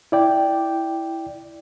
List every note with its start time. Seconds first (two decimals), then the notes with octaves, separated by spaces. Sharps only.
0.12 E4 D5 G5